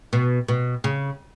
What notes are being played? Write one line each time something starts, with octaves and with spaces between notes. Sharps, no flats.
B2
B2
C#3